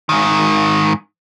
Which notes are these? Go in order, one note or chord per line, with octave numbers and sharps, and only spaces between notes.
G#2 D#3